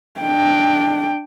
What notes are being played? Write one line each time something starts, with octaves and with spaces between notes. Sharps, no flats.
D4 G5